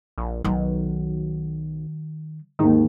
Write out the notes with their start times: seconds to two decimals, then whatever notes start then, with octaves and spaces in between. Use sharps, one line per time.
0.18 A#1
0.44 B1 D#3 F#3
2.59 D#2 G#2 D#3